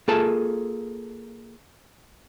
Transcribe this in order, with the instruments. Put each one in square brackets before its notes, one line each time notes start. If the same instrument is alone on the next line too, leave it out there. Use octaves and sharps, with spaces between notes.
[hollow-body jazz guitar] A#3 F4 G#4 A4 A5